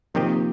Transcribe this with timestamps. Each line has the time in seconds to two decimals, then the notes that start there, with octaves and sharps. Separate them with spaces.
0.14 C3 D#3 F3 A#3 C4 G4 D#5